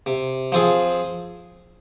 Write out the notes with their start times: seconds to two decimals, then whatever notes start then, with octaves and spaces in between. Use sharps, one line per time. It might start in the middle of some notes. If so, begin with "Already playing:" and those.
0.06 C3
0.52 F3 C4 F4 G#4